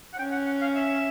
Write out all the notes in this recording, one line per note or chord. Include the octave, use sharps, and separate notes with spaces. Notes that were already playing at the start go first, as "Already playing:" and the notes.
F#5
C#4 G5
F#5
F#5
F5
E5